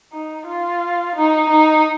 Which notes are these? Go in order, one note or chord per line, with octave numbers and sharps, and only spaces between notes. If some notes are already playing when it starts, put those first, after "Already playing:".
D#4
F4
D#4
D#4